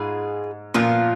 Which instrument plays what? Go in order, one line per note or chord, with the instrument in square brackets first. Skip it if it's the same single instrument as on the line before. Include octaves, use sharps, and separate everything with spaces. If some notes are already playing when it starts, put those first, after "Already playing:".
Already playing: [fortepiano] G#2 [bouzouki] F4 G#4 B4
[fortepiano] A#2 [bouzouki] F3 B3 F4 A#4